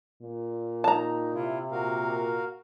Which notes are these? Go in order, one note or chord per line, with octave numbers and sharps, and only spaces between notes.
A#2
D#4 A5 A#5
C3 E4 F4
A#2 F#4 A#4 F5